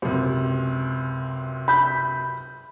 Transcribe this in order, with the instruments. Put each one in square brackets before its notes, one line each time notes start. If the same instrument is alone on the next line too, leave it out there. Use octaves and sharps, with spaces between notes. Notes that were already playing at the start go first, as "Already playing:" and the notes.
[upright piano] C#2 F#2 C3
[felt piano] B5 G6